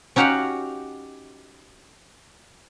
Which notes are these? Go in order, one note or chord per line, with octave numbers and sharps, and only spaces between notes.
C#4 D#4 F#4 G4 F5 F#5